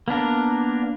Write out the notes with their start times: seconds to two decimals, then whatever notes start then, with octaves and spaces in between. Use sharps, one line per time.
0.08 A#3 B3 D4 A#4